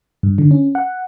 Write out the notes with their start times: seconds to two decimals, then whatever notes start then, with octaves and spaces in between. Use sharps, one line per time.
0.23 G2
0.38 D3
0.51 C#4
0.75 F#5